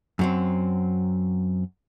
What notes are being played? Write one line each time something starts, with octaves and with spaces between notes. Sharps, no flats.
F#2 F#3 C4